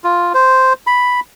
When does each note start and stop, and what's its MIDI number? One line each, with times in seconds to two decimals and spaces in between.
0.04 0.33 65
0.34 0.73 72
0.87 1.20 83